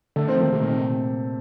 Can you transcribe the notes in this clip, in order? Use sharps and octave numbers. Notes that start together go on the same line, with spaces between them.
D3 A3
D#3 C4
F3
D#3 A#3
C3 D#3
A#2
C3